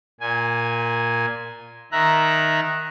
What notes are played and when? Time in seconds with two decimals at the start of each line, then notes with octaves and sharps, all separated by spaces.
0.20 A#2 G#5
1.92 D#3 E5 A#5 F#6